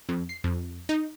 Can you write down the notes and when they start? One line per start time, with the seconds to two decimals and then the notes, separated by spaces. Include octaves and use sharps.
0.09 F2
0.29 C7
0.44 F2
0.89 D#4